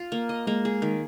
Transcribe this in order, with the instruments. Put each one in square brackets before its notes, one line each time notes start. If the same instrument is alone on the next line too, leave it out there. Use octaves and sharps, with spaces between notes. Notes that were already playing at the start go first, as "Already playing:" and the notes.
Already playing: [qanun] F4
A#3
D#5
[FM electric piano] G#3 [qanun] A#3
[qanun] G#4
D#3